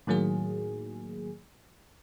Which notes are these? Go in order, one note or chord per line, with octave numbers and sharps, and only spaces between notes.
A2 D#3 F#3 A#3 G#4